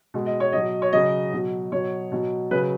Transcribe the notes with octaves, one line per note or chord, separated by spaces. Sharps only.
B2 G#3
D#5
C#5
B2 F#3 D#5
C#5
C#3 F#3 D#5
B2 F#3
B2 F#3 C#5
B2 F#3
C#3 F#3 B4